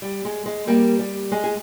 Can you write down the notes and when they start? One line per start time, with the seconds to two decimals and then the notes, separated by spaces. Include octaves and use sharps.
0.02 G3
0.25 G#3
0.46 G#3
0.67 G3 A#3
0.99 G3
1.32 G#3
1.44 G#4